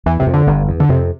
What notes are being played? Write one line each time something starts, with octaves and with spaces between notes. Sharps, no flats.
E2 E3
E2 C3
F2
D3
G1 G2
E2
D3
F2 C3